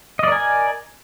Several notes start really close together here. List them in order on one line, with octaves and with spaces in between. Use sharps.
D#5 D5 A#4 G#5